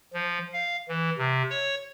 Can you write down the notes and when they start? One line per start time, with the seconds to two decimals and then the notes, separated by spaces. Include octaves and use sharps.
0.13 F3
0.53 F5
0.88 E3
1.18 C3
1.50 C#5